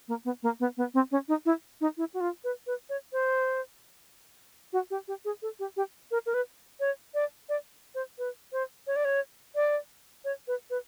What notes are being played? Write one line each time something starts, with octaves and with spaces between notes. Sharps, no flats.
A#3
B3
A#3
B3
B3
C4
C#4
D#4
E4
D#4
E4
F#4
F4
B4
B4
C#5
C5
F#4
G4
G4
G#4
A4
G4
G4
A#4
A#4
B4
C#5
D5
D5
C5
B4
C5
C#5
D5
C#5
D5
C#5
B4
B4